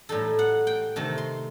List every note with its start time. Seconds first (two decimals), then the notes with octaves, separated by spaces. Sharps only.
0.09 A2 G3 D#4 A4
0.39 F#5
0.67 G5
0.96 C3 D#3 A3 A5
1.18 C6